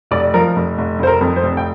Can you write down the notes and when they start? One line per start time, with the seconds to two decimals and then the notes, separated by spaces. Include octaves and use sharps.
0.11 F1 D5
0.34 F3 A#4
0.56 F1
0.78 F1
0.99 F1 C5
1.07 A#4
1.21 F2
1.36 C5
1.43 F1
1.57 G5